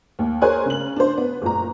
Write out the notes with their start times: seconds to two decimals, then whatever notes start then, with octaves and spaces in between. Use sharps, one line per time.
0.19 D#2
0.41 G#4 A#4 C5 C#5 G#5 F#6
0.66 C#3 F#7
0.96 D4 C5
1.17 B3
1.42 F#1 A#2 A#5